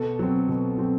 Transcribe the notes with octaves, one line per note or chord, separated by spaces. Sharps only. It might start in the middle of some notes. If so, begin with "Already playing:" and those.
Already playing: B2 A4
F#3 C4
B2
F#3 C4